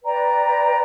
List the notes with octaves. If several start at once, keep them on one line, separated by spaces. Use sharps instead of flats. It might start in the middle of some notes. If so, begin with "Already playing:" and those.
B4 D5 G5 A#5